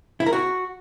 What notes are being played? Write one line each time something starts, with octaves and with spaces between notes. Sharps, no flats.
E4
A#4
F#4